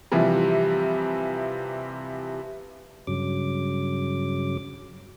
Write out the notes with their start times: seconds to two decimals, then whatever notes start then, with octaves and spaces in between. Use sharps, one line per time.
0.12 C3 E3 F3 G3
3.07 G2 C#3 F#3 D6